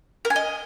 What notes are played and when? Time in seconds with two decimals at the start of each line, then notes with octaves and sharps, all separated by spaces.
0.25 A#4
0.30 G#5
0.36 D#5